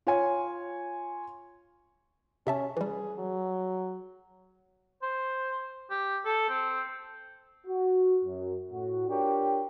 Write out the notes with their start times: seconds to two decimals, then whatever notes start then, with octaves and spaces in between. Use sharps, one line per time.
0.07 F4 C#5 G#5
2.47 C3 C#4 E5 A5
2.77 E3 G3 G#4
3.19 F#3
5.03 C5
5.91 G4
6.25 A4
6.49 C4
7.67 F#4
8.24 F#2
8.72 A2 F#4
9.08 D4 F4 G4 A#4 C#5 G5